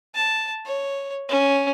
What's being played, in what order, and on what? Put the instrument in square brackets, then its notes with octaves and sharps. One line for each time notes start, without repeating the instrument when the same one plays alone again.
[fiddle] A5
C#5
C#4